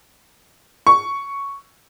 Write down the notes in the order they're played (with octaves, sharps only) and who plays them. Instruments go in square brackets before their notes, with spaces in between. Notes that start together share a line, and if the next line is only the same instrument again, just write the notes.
[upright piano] C#6